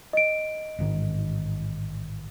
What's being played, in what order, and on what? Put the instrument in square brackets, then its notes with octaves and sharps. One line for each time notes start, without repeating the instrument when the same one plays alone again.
[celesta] D#5 D7
[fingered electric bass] A1 G#2 D#3